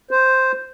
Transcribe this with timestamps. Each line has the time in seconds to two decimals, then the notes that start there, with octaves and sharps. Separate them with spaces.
0.11 C5